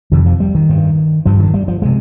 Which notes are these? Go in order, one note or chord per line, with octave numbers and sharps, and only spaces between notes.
F2 C3 D#3
F3
G3
D#3
G2
G2 F3
D#3
G3
F3
C3 G#3